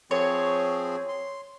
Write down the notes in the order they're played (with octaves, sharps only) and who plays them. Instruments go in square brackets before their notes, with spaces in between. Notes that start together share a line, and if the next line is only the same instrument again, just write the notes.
[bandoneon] F3 C4 G#4 [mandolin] C#5
[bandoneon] C6